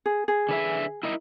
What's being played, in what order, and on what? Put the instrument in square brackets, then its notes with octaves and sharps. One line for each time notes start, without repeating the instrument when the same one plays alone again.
[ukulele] G#4
G#4
[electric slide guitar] D3 B4 E5
E4 A#4 D#5